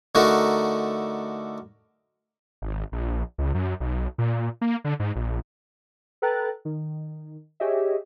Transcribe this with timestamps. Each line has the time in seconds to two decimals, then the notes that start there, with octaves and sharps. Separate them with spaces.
0.15 D3 A3 D#4 F#4 A#4
2.62 G#1
2.92 A#1
3.38 C#2
3.55 F#2
3.80 B1
4.18 A#2
4.61 A#3
4.85 D3
5.00 G#2
5.16 A#1
6.22 A4 B4 G5 A#5 F#6 A6
6.65 D#3
7.60 G4 G#4 C#5 D#5 E5